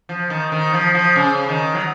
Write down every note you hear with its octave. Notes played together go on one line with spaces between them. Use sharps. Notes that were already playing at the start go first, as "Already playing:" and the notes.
F3
D#3
D#3
F3
F3
C#3
D#3
F#3